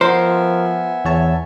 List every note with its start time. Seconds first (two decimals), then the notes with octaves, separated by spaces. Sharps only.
0.01 F3 B3 A#4 C5 E5 G#5
1.05 E2 C#5 A5